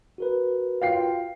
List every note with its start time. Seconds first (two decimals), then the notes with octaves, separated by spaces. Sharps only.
0.18 F#4 A#4 B4
0.82 F4 F5 G5 C7